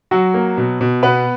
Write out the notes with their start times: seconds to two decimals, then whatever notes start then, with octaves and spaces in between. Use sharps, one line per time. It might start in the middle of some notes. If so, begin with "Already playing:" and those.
0.11 F#3 F#4
0.34 A#3
0.57 B2
0.81 B2
1.03 B2 B3 B4